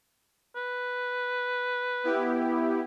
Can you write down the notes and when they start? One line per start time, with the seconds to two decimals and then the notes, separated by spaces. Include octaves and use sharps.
0.56 B4
2.04 B3 E4 G4